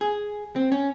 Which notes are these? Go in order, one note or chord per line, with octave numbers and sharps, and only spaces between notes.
G#4
C4
C#4